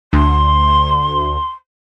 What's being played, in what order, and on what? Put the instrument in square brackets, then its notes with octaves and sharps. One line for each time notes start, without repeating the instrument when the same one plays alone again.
[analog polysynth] D2 [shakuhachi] C6